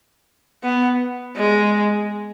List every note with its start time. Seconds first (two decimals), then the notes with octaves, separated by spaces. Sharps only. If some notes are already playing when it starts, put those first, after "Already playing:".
0.64 B3
1.37 G#3